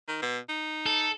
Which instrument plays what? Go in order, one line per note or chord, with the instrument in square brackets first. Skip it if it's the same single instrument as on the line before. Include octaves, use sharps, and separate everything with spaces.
[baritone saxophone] D#3
B2
D#4
[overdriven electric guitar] A4